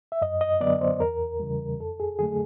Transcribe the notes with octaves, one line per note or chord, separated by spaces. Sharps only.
E5
F#2 D#5
D#5
D3 F#3 B3 D5
C5
E2 A#4
C#3 E3 G3
F2 A4
G#4
D3 F#3 A3 G#4